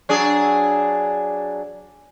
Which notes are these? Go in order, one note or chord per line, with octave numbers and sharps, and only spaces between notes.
F#3 D4 G#4